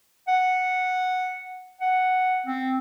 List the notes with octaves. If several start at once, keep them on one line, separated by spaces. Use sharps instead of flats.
F#5
F#5
C4